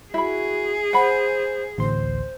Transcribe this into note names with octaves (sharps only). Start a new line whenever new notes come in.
E4 F#4 G#4 B5
C5 F#5 B5
A1 D2 C5 C6